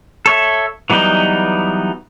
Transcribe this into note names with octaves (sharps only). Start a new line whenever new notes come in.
A4 C#5 E5
E3 F#3 G3 B3 D#4